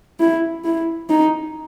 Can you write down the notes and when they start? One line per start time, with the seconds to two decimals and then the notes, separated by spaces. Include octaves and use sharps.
0.20 E4
0.64 E4
1.09 D#4